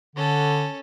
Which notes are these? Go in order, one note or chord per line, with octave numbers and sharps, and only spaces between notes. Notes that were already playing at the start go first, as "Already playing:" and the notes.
D3 C#4 A4